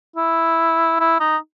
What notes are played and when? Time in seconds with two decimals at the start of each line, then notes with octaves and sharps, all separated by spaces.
0.16 E4
1.00 E4
1.20 D#4